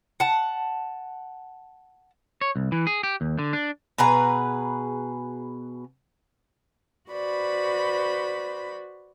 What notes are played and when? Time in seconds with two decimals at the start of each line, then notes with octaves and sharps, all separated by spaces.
0.20 F#5 A5
2.41 C#5
2.56 C2
2.72 E3
2.87 G#4
3.03 G4
3.21 D#2
3.39 D3
3.53 D4
3.98 B2 G#4 B4 A#5
7.09 F#4 B4 C5 D5 B5